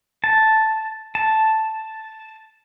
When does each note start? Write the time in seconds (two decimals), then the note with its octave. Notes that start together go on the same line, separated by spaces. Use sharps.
0.24 A5
1.15 A5